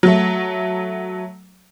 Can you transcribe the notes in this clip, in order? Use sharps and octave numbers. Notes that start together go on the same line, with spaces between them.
F#3 A3